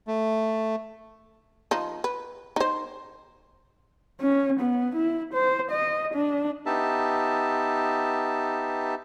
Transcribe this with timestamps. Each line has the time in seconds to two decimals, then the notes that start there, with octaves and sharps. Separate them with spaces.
0.08 A3
1.71 F3 D#4
2.04 B4
2.56 D#4 C5
4.21 C#4
4.60 B3
4.95 E4
5.34 C5
5.71 D#5
6.14 D4
6.66 B3 D#4 G4 E5 A5